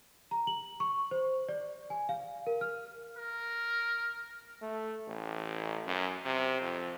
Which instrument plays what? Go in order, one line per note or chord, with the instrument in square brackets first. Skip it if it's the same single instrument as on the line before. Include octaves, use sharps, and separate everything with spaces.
[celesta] A#5
F#7
C#6
C5
D5
G#5
F5
A#4
F6
[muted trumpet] A#4
[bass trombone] A3
A1
F#2
C3
F2